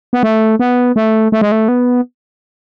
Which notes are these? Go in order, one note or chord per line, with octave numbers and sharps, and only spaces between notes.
B3
A3
B3
A3
A3
G#3
A3
B3